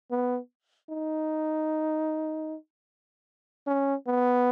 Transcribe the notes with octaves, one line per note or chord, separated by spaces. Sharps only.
B3
D#4
C#4
B3